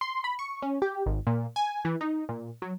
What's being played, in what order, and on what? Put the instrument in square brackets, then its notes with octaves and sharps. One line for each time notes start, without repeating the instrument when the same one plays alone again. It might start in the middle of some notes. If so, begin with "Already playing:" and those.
[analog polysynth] C6
B5
C#6
C#4
G4
G#1
A#2
G#5
E3
D#4
A#2
F#3